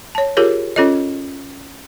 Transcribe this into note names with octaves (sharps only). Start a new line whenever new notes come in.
C#5 A5
F4 G4 G#4 A#4 C#5
C#4 F4 A4 C#5 D#5